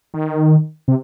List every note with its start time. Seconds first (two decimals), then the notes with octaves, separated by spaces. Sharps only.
0.14 D#3
0.88 C3